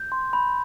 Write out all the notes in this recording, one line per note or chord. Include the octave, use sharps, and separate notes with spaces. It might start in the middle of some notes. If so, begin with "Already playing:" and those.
Already playing: G6
C6
B5